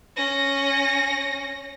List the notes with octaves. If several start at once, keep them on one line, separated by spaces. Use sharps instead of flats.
C#4 A#6